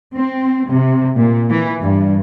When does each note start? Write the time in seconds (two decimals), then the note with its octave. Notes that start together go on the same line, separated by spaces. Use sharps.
0.15 C4
0.69 C3
1.16 A#2
1.50 E3
1.81 G2